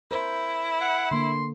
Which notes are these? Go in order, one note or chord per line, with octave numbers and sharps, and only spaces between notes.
E4 A#4 C5
F#5
D3 A#3 C6